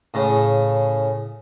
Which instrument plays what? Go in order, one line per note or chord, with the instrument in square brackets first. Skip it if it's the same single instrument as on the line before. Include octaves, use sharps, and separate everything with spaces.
[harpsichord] A2 C#3